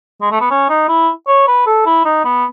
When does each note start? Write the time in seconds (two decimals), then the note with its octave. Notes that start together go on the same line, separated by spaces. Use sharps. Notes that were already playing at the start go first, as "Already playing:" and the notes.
0.22 G#3
0.31 A3
0.41 B3
0.50 C#4
0.69 D#4
0.89 E4
1.27 C#5
1.48 B4
1.67 A4
1.86 E4
2.05 D#4
2.25 B3